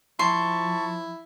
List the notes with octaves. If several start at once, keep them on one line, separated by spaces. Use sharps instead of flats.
F3 E4 A5 C6 C#6